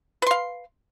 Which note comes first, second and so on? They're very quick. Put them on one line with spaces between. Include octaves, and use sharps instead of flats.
B4 C6 F5